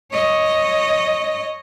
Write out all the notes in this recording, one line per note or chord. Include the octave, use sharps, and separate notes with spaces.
C#5 D#5